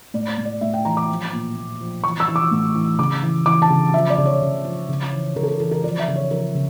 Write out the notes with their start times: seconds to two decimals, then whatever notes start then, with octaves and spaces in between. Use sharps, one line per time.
0.14 A2 D5
0.38 A2
0.45 D5
0.61 A2 E5
0.74 G5
0.85 E3 A#5
0.97 D6
1.09 F3
1.33 A#2
1.56 A#2
1.81 F3
2.04 E3 C#6
2.20 E6
2.28 E3
2.36 D6
2.51 A2
2.75 E3
2.99 C#3 D6
3.23 E3
3.46 E3 D6
3.62 A5
3.70 C#3
3.94 F3 E5
4.10 D5
4.18 C#3
4.25 C#5
4.41 C#3
4.65 F3
4.89 C#3
5.13 E3
5.36 C#3 A#4
5.43 A4
5.48 A#4
5.60 E3 A4
5.71 A#4
5.84 F3 D5
5.99 E5
6.08 C#3
6.16 C#5
6.31 F3 A#4
6.55 C#3